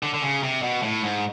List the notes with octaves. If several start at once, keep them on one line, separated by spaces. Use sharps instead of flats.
D3
D3
C#3
C3
B2
A2
G#2